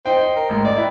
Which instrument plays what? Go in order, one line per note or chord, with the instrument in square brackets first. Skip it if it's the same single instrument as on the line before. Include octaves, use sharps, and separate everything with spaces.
[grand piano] D#4 G5 [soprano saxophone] C5
[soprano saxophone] A#4
[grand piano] A1 G#2
[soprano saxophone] D5 [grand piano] D#5
[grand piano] E4 B4 G5